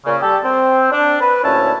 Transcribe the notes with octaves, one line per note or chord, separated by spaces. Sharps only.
A#2 C#3
G3 G4 A4
C4
D4
B4
D2 A#2 C#4 E4 C#5 A5